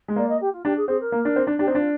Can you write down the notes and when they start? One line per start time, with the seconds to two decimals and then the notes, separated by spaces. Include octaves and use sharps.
0.08 G#3
0.16 A#3 D5
0.28 D#5
0.40 G4
0.52 F4
0.64 D4 G4
0.76 G#4
0.88 C4 G#4
1.00 A#4
1.12 A#3
1.25 D4
1.36 C4
1.47 D4
1.59 D4 G4
1.67 C4 D#4
1.75 D4 F4